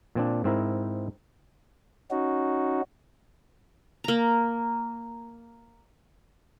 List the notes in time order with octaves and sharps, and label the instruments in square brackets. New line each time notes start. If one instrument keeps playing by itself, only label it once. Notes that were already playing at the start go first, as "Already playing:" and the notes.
[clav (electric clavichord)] A#2 C4 D4
G#2 C4 E4 A#4
[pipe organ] C#4 D#4 F#4
[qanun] A#3 A#5